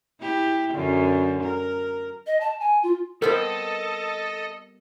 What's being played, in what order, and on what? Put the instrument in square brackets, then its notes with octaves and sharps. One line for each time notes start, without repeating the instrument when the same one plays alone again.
[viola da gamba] E4 G4
F#2 D3
A#4
[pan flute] D#5
A5
G#5
F4
[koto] G3 B3 C4 [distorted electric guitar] A4 [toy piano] A#4 [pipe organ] D#5